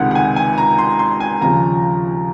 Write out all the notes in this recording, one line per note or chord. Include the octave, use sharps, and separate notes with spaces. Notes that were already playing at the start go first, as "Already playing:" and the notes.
Already playing: C#2 C3 D#3 G#3 F#5
F#5
G#5
G#5
A#5
C6
C6
G#5
D#2 C#3 F3 A#5